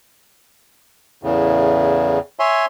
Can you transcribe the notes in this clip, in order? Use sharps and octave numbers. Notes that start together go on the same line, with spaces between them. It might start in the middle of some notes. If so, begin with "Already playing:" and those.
E2 A2 C#3
C#5 E5 G#5 C6